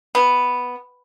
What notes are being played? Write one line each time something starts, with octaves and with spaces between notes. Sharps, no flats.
B3